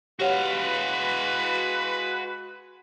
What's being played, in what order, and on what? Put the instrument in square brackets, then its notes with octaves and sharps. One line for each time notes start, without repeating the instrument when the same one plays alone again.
[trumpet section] G#3 B4 [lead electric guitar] F#4 F5 [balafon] G4 C#5 F#5